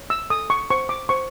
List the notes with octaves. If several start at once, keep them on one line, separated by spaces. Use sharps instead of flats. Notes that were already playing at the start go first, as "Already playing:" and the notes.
Already playing: C#5
E6
A4 D#6
C#6
C5 C#6
D6
C5 C#6